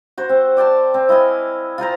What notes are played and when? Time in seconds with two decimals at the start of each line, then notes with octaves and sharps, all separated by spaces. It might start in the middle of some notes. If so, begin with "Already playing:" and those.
0.17 F#4 C5
0.29 C4
0.57 D5 G5 A5 C6
0.94 C4
1.09 E4 D#5 F5 G#5
1.78 F4 A#4 C5 A#5